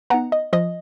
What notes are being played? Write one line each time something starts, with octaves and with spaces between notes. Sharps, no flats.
B3 D#4 F#5 A#5
D#5
F3 D#5